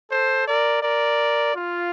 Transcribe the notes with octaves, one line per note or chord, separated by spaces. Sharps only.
A4 C5
A#4 D5
A#4 D5
F4